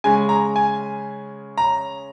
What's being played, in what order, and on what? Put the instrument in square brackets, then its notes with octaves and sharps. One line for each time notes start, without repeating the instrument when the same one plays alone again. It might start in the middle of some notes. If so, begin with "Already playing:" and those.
[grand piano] C#3 G#3 C#4 G#5
A#5
G#5
A#5